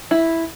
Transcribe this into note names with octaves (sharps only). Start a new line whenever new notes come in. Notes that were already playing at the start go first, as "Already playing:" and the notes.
E4